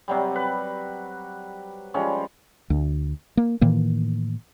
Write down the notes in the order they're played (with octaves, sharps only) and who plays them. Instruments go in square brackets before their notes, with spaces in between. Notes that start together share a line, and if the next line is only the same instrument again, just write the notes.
[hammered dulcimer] C3 F#3 G3
B4
F3 G3 G#3 C#4
[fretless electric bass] D2
A#3
A2 D#3 E3 A#3